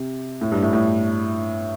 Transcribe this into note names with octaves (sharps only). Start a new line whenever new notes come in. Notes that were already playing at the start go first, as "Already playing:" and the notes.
Already playing: C3
A2
G2
A2
A2